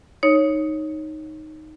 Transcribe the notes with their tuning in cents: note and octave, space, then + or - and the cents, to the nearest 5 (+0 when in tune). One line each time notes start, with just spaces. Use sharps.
D#4 +0 C#5 -10